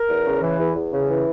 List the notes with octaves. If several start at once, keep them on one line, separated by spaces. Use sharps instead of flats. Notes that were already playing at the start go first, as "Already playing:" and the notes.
Already playing: A#4
E2
C#3
E3
E2
E2
C#3
E3